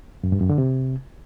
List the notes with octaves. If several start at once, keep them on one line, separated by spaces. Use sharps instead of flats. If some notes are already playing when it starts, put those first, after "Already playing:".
F#2
G2
F#2
D3
C3